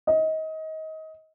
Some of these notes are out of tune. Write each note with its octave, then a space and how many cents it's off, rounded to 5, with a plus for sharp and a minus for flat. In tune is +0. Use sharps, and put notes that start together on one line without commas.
D#5 +25